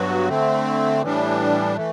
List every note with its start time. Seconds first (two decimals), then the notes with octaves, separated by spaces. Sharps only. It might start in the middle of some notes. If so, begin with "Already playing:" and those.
Already playing: G2 F#3 B3 F#4
0.28 D3 A3 C4
1.02 A2 E3 G3 D4
1.76 E3 A3